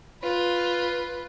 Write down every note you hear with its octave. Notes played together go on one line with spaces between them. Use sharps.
F4 B4